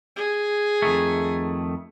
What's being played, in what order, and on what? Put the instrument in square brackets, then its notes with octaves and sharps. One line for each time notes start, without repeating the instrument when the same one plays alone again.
[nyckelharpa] G#4
[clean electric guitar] F2 D#3 A3